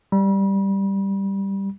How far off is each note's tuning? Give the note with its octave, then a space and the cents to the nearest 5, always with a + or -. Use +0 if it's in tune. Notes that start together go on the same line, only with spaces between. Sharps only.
G3 +0 B5 -40